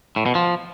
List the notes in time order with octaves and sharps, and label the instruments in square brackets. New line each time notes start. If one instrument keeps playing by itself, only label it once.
[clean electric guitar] A2
B2
F3